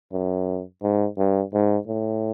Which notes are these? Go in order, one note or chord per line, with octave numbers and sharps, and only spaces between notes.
F#2
G#2
G2
G#2
A2